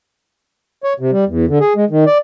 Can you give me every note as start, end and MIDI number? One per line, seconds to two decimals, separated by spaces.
0.84 0.93 73
1.00 1.11 48
1.11 1.25 55
1.28 1.45 40
1.48 1.59 50
1.61 1.73 68
1.76 1.85 56
1.90 2.04 51
2.07 2.18 74